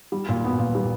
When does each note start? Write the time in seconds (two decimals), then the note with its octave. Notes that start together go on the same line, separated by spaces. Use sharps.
0.12 G3
0.29 A#2
0.44 B3
0.59 A#2
0.75 G3